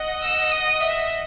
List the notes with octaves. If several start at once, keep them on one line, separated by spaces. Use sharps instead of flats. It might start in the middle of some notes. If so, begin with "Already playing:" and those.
Already playing: D#5 F#5
E6
D#6
E5